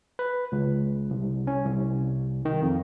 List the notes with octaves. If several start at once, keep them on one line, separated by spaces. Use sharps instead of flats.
B4
C#2
C2
C#4
C2
D#3
F2